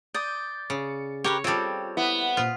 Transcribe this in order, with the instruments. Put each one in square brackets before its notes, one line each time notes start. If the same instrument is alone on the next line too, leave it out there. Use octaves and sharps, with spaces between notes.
[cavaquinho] D5 D#6 [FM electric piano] G6
[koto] C#3 [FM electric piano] C#7
[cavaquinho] G4 A#4 B4 [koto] C#5
[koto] G3 C4 [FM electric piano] F4 G5 [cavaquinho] A4 C#5
[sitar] B3 [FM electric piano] E4
[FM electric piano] A#2 C5 D#6 [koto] F4